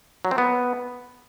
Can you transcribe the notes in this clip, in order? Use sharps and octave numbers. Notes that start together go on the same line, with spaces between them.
F#3
C4
B3